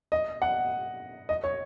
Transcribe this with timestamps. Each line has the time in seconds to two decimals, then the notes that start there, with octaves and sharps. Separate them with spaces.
0.12 D#5
0.42 F#5
1.29 D#5
1.43 C#5